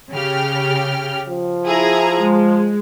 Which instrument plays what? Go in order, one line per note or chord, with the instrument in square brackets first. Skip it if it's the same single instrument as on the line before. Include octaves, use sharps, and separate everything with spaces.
[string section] C#3 G4 F6
[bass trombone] F3
[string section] E4 G#4 A#5
G#3